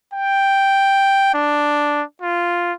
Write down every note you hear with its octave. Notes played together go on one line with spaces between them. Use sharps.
G5
D4
F4